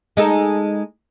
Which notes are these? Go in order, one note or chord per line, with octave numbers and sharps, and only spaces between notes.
G#3 D#4 A4